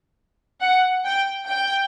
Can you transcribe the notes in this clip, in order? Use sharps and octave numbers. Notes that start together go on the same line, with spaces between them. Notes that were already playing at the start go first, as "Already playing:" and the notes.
F#5
G5
G5